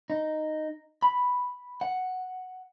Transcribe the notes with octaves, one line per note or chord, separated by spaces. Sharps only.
D#4
B5
F#5